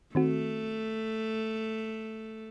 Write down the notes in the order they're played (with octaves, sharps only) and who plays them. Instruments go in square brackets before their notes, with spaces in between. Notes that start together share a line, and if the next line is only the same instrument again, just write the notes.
[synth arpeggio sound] D#3 C4 F#4 [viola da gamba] A3